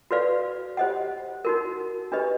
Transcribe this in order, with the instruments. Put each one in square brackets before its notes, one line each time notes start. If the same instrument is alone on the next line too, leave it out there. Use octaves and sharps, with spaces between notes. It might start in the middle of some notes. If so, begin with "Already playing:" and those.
[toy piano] F#4 B4 D5 F5
G4 C5 D#5 F#5
D#4 F#4 A#4
D4 G4 B4 D#5